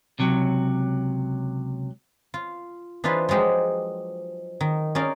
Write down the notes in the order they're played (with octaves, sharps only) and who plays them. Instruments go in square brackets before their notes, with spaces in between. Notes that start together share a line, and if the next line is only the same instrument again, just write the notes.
[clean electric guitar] C#2 C3 F#3
[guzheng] F4
E3 D4 D#4 F4 B4 C5
F3 F#3 G#3 G4
D#3
C#4 D#4 A#4 D5 F5